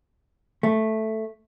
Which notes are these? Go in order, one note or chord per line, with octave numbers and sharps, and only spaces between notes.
A3